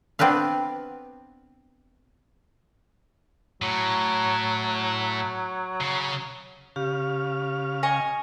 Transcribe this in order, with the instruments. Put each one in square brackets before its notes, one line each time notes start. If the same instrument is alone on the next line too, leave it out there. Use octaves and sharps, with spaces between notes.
[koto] B3 C4 D4 B4 F5
[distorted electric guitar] A2 [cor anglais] F#3
[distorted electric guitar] C#3
[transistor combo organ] C#3 F5 [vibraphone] G4
[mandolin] D#5 G#5 C#6